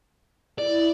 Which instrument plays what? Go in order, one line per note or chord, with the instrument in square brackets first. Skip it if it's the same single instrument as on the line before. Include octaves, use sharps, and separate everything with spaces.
[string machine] E4 [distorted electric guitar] D5